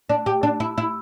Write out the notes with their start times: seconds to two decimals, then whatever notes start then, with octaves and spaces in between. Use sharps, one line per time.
0.09 D4
0.26 G4
0.43 D4
0.60 E4
0.78 E4